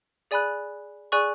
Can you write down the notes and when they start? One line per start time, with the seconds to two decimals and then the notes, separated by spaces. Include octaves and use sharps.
0.31 G#4 D5 G#5 B5 F#6
1.12 G#4 D5 G#5 C#6 F#6